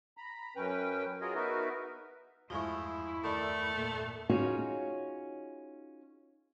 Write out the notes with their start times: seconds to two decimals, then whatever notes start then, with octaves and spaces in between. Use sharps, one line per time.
0.17 A#5 B5
0.56 F#2 C#4 B4 G5
1.21 F4 F#4 G#4 A#4 C#5 D#5
1.35 B3 D#4 F#4 A#4 B4 E5
2.50 E2 G2 F3 G#3 A3 E4 C6
3.24 D#3 A3 D4
3.76 A#2
4.29 C#4 D#4 F4 F#4 G#4 C#5